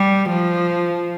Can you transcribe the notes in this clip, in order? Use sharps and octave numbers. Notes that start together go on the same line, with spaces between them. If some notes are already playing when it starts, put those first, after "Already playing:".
Already playing: G3
F3